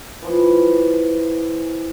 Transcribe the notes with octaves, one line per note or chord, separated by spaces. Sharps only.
E3 F3